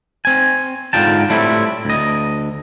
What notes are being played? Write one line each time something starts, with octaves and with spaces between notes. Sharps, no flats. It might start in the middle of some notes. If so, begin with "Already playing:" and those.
C4 G#5
G#2 D3 F4 G5 A5
A2 G3 A3 C4 E4
D2 D#5